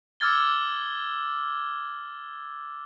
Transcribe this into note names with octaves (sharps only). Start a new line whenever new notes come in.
D6 E6 F6 G#6 A6 G7